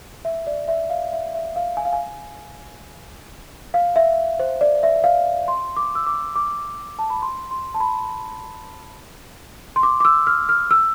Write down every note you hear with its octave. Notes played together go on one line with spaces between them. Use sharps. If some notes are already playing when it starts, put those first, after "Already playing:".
E5
D5
E5
F5
E5
E5
F5
G#5
F5
G#5
F5
E5
C5
D5
E5
E5
F5
C6
D6
E6
D6
D6
A5
B5
C6
C6
A5
B5
C6
D6
D6
E6
F6
F6
E6